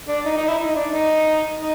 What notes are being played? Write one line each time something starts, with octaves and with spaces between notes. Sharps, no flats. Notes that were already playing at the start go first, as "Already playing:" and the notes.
D4
D#4
D#4
E4
D#4
D4
D#4
D#4